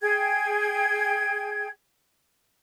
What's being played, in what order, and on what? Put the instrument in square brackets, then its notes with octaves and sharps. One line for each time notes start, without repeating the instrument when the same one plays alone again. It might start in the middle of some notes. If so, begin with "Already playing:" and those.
[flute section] G#4 G5 G#6